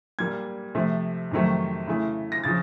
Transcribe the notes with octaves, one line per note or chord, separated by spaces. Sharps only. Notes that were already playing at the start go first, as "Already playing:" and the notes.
A#2 G3 A#3 G#6
C3 F3 A3
F2 C3 D#3 F#3 A3
C#3 E3 A3
A#6
C#3 F3 A6